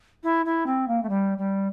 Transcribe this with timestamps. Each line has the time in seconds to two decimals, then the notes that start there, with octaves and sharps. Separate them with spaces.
0.24 E4
0.46 E4
0.66 C4
0.88 A#3
1.03 A3
1.09 G3
1.38 G3